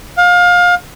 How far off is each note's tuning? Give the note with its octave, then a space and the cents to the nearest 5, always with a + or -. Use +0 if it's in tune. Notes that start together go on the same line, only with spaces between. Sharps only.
F5 +25